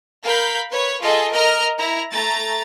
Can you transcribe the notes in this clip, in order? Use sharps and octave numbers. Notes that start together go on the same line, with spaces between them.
A#4 F5 B5 G6
B4 C#5
F4 G#4 A4 D#5
A#4 D#5 A#5 F6
E4 A#5
A3 A#5 A6